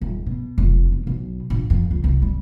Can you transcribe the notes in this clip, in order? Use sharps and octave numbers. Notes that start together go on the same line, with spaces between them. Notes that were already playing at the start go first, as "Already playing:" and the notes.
D#1
B2
F1
B1
B1
A#1
F2
C#2
C2
G3